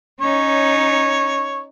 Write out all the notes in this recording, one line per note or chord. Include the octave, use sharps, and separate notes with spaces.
C#4 D#4 C#5